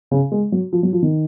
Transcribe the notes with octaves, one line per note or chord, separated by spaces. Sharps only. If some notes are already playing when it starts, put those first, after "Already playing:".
C#3
G#3
F#3
F3
F#3
F3
D#3